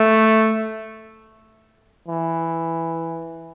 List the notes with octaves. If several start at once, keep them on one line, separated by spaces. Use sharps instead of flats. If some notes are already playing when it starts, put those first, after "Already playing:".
Already playing: A3
E3